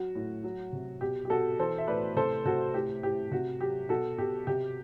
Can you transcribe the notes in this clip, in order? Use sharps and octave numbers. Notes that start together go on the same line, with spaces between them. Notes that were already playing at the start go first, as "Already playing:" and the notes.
Already playing: F#3 F#4
A2
F#3
C3
B2 G4
G4
B2 F#4 A4
E3 A4 C5
E5
A2 B4 D5
C3 A4 C5
C3 F#4 A4
A2 G4
A2 G4
C3 F#4
F#3 G4
B2 F#4 A4
B2 G4
C3 G4